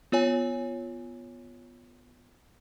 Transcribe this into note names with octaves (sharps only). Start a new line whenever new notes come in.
B3 F4 C#5 G#5